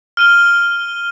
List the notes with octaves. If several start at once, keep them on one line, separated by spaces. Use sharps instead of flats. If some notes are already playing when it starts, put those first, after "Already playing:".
F6 D#7 G7